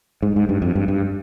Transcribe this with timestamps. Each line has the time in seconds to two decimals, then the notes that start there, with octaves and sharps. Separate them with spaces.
0.23 G#2
0.36 G#2
0.49 G2
0.62 F2
0.75 G2
0.88 G2